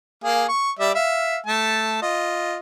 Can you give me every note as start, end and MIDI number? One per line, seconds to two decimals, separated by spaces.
0.24 0.46 58
0.24 0.46 68
0.49 0.71 85
0.79 0.92 55
0.79 0.92 74
0.79 0.92 76
0.95 1.38 76
0.95 1.38 77
1.46 2.02 57
1.46 2.02 81
2.02 2.60 65
2.02 2.60 75